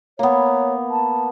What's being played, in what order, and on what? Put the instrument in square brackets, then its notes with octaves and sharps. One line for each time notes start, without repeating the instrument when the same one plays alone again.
[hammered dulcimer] A#3 B3 [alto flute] C#5
[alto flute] A5